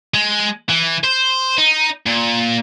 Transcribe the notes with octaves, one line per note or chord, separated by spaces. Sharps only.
G#3
E3
C5
D#4
A#2